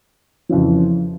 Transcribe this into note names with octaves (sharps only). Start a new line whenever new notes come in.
F2 C#3 E3